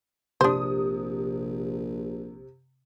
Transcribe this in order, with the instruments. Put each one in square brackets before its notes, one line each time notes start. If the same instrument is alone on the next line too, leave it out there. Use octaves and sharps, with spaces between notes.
[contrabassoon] A#1 [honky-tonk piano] C3 D#6 [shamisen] D4 C5